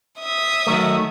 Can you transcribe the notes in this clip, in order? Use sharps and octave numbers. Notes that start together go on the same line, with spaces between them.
E5 D#6
D#3 F#3 A3